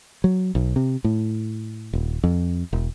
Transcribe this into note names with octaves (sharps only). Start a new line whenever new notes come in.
F#3
B1
C3
A2
D#1
F2
E1